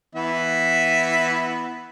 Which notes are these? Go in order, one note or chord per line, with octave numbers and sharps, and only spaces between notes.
E3 B3 E5